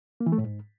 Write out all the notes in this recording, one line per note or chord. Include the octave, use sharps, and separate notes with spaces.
A#3
E3
A3
A2
G#2